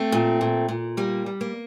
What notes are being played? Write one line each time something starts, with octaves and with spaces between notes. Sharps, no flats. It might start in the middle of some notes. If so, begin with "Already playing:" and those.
Already playing: A3 C4
A#2
A#2
A#2
G3 A#3
G3
A#3